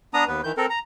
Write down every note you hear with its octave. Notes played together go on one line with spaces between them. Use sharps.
B3 D4 A#5 D#6
D#2 B3 B4
D#3 E3 G6
C4 A4 A#4
A#5